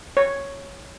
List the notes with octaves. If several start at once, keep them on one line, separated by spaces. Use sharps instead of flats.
C#5